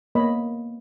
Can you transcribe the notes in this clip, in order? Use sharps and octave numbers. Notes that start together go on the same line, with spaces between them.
G#3 A#3 B3 C#5 D#5 B5